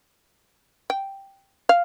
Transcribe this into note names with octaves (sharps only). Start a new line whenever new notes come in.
G5
F5